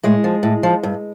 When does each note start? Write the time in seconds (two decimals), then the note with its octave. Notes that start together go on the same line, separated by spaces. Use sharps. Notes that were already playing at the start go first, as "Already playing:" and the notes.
0.03 A2 G#3
0.24 F3
0.43 A2
0.63 F3
0.83 G2